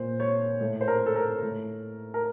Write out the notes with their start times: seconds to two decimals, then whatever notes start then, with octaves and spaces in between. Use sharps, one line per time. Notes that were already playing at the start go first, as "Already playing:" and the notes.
Already playing: A#2 C5
0.20 C#5
0.60 A2
0.81 C5
0.88 A#4
1.06 A4
1.16 A#4
1.43 A2
2.14 A#4